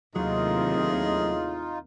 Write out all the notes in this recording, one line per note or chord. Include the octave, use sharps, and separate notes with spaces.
D#2 A2 C3 F#3 D#4 F4 G#4 D#5